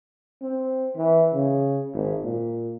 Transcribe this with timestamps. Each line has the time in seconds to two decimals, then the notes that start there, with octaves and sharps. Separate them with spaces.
0.42 C4
0.96 E3
1.33 C#3
1.94 G#1
2.23 A#2